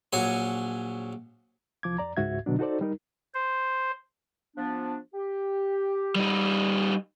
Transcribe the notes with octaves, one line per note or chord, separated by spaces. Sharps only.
A#1 F#3 C#5 G#5
C2 F3 D6 G#6
F2 D5 A#5
C#2 G#2 F#4 E5 G#6
B2 D3 F#3 D4
D#4 F#4 A4 C5 D5
G3 D#4 A#4
C5
F3 B3 D4
G4
G3 D#4